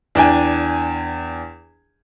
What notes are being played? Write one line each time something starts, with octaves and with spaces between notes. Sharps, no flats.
E2 D4 G5 G#5